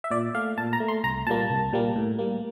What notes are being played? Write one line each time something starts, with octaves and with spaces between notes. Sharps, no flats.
E5
A#2 D5
A3 F5
A#2 A5
A#5
A3
C6
C2 A#5
A#2 G3 A#3 A5
C2
A#2 G3 A#3
A2
G3 A#3